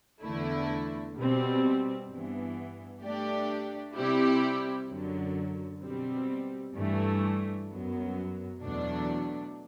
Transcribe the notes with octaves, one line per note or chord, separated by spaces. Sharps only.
E2 D3 A3 E4
B2 G3 C4
G2 E3 B3
A3 D4 G4 D5
C3 G3 C4 E4 G4
F#2 D3 F#3
B2 G3 C4
G2 E3 A3
F#2 F#3 B3
E2 B2 F#3 A3 D4